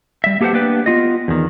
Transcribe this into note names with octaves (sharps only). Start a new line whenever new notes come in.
G3 E5
A#3 G4 A4 B4 C5 F#5
A#3 B3 D4 G4 B4
B3 F4 D#5
E2 D#3